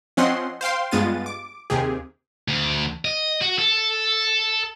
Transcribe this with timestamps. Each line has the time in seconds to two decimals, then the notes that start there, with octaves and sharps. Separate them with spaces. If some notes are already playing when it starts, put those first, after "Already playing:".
0.17 F3 C4 C#4 D#5 F#5 C6
0.61 C5 F5 G5 C6
0.91 G2 G#3 B3 F4 A6 D#7
1.26 D6
1.70 D#2 C3 G4 G#4
2.48 D2
3.05 D#5
3.41 F#4
3.59 A4